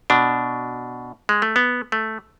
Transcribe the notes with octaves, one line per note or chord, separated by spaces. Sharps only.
B2 D4
G#3
A3
B3
A3